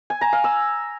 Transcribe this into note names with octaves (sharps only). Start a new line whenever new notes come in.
G#5
A#5
F5
E6